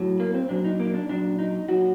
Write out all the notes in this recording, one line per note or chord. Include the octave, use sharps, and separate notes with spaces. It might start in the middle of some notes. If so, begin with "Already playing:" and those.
Already playing: A2 F#3
A#3
C4
A#2 F#3 D4
D#4
A#3
D4
A#2 F#3 D4
D#4
A#2 F#3 F#4